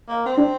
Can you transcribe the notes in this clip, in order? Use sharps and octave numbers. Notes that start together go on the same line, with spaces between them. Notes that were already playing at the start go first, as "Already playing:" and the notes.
A#3
C4
D4